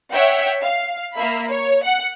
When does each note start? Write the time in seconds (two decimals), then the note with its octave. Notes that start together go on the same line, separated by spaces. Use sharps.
0.11 C#5 E5 F#5 G5
0.62 F5
1.14 A#3 E5 B5
1.49 C#5
1.83 F#5